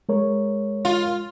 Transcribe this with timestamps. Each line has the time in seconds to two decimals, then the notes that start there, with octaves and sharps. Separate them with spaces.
0.09 G#3 A#4 C#5
0.85 F4